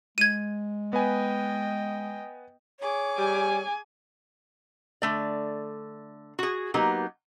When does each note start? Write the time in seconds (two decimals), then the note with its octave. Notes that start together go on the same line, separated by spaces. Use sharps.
0.18 G#3 G#6 D#7
0.93 B3 B4 D#5 G5 G#5
2.80 G#4 C#5 D6
3.18 G3 G#5
5.02 D3 A3 D5
6.39 F#4 G#4
6.74 F#3 A#3 B3 D#4 G4